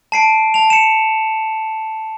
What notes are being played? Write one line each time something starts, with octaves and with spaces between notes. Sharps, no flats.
A5 C7 D7
A5 F7
C#7 E7